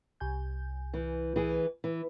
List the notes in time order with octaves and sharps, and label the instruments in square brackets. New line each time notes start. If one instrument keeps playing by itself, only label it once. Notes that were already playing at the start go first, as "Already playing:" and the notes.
[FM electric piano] C2 G#5 G6
[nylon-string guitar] E3
E3 G#4
E3